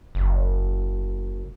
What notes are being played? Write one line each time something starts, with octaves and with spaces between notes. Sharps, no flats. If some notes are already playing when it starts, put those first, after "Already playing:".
F#1